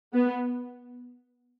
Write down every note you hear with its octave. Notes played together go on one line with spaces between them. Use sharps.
B3